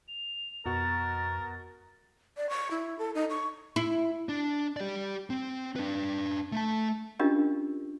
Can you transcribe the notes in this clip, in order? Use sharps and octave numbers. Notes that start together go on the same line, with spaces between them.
F7
F2 B2 F#4 A#4 A6
D5
C#6
E4
A4
D#4
C#6
E4
D4
G4 D5
C4
D4 B4
A3 A5
C#4 D4 F4 G4 A#4 D#5